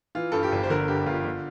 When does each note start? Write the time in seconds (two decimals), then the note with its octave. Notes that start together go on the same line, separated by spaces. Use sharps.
0.15 E3 F4
0.32 G2 A4
0.43 G4
0.52 G1
0.63 C5
0.70 D3 A#4
0.88 G2 G4
1.06 G1 F4
1.24 D3